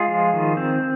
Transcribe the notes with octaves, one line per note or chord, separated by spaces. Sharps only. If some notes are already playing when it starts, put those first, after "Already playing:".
Already playing: G#3 F4 G#4
F3
D#3
C4